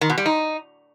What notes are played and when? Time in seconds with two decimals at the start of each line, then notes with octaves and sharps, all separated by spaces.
0.01 D#3
0.10 B2
0.18 G3
0.26 D#4